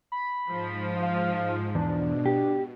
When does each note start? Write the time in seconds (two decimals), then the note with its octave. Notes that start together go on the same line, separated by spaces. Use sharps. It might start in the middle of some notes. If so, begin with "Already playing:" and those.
0.12 B5
0.49 G#2 F3
1.02 F5
1.75 E2 B2 D4
2.26 G4